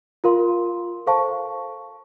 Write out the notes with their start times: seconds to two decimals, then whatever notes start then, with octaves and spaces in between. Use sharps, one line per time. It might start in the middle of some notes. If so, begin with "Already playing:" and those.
0.24 F4 A#4 F5 C6
1.07 A4 C5 F5 A5 C#6